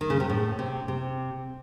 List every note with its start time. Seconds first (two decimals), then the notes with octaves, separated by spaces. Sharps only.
0.01 D#3
0.10 C#3
0.20 C3
0.29 A2
0.59 C3
0.88 C3